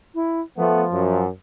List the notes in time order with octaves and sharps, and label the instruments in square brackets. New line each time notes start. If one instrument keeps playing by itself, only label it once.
[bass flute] E4
[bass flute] F3 [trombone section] A3 B3
[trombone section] F#2